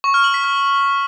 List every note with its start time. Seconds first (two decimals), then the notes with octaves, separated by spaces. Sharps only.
0.04 C#6
0.14 F6
0.24 F#7
0.34 B6
0.44 F6